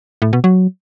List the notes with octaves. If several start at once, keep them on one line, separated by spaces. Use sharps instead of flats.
A2
B2
F#3